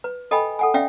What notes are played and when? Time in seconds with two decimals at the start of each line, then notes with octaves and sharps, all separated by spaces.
0.04 B4
0.31 A4 D#5 G5 G#5 B5
0.59 A4 F#5 G#5
0.74 C#4 D5 E5 F5 G5